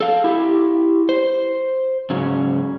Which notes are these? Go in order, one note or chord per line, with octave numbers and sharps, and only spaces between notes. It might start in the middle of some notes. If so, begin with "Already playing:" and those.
A4 F5
E4 G4
C5
G#2 C#3 F#3 C#4